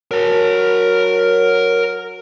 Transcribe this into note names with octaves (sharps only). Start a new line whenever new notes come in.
F#3 A#4 A5